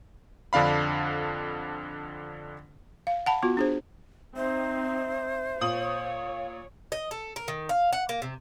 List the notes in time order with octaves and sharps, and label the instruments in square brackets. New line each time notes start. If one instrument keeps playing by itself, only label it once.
[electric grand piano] F2 D3 D4 F5 B5
[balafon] F5
F#5 A5 B5
B3 F4 F#4
D4 G#4 C5
[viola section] C4 D#4 [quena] C5 [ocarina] E5
[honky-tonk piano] A#2 D#6 F#7 [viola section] C#5 [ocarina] F5
[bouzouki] D#5
A4
A#4
D#3
F5
F#5
A#3
C3